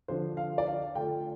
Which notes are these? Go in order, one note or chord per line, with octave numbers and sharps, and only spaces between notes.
D3 F3 D4 C5
F5
D5
F5
D3 A3 F4 G5